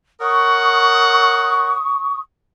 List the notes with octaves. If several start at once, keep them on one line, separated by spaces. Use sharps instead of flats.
A#4 C#5 F#5 C#6 D#6